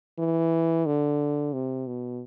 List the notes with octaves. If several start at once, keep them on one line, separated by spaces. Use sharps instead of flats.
E3
D3
C3
B2